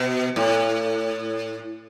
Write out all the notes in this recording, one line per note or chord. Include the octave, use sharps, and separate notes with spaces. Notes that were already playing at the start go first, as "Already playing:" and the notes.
Already playing: B2
A2